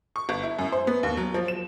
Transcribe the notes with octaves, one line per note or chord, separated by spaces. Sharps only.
C#6
G1
E4
F#2
C5
B3
D#2
F#3
F3
E7